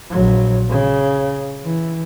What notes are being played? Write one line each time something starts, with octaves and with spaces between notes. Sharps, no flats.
A#1 F#3
C#3
E3